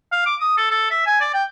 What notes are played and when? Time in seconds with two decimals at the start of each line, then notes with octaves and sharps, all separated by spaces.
0.12 F5
0.26 D6
0.40 D#6
0.57 A4
0.71 A4
0.91 E5
1.06 G#5
1.21 D5
1.34 G5